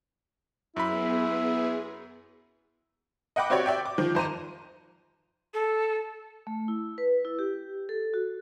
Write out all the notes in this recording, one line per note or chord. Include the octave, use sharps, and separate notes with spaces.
F#2 B3 E4 G#4 B5
D#5 F#5 G5 B5 D6
C4 F#4 G4 C#5 D5
D5 E5 G5
D6
D#3 F3
F2 C5 A#5 D#7
A4
A3
E4
B4
E4
G4
A4
F#4